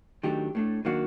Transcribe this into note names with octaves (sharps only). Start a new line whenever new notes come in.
D#3 F#3 A3 D4 G4
A2 A3 D4
D#3 F#3 A#3 D4 F#4